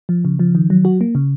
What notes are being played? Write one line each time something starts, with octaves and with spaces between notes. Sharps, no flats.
F3
C#3
F3
D#3
F#3
F#4
A#3
C#3